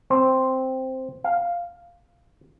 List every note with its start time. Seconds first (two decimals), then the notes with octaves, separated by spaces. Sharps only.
0.10 C4
1.24 F5